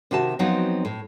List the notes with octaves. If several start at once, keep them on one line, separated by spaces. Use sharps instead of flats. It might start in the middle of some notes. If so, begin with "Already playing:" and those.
C3 D#3 F#4 E5 A5
F3 F#3 B3 C4 D#4 F#4
A2